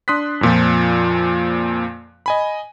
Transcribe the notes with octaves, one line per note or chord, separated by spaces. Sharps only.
D4 C6 D#6 F#6 B6
F2 A#2 F3
D#5 G#5 B5